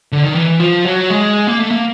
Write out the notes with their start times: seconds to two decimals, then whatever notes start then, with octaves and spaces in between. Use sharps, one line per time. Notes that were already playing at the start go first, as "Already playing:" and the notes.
0.12 D3
0.23 D#3
0.34 E3
0.60 F3
0.85 F#3
1.10 G#3
1.47 A#3
1.59 A3
1.70 A#3